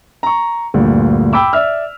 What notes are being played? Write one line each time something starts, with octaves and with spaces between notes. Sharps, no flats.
A#5 C#6
D2 G2 A#2
G5 B5 D6 E6
D5 E5 F6